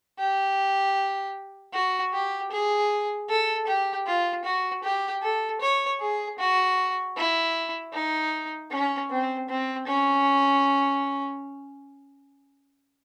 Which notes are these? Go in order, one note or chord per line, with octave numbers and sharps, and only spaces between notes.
G4
F#4
G4
G#4
A4
G4
F4
F#4
G4
A4
C#5
G#4
F#4
E4
D#4
C#4
C4
C4
C#4